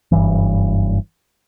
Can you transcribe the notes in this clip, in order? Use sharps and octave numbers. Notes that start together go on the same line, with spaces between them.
F#1 C#2 G2 E3